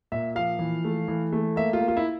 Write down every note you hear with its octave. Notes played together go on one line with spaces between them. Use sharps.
A#2 E5
F3 F5
E3
A3
E3
A3
A#3 E5
F4
A#3
F4
E4